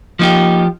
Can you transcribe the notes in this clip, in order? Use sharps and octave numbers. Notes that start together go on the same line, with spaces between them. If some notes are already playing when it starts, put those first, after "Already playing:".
F3 A#3 D#4 G4